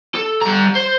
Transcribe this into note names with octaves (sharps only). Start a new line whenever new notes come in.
A4
G3 A#5
C5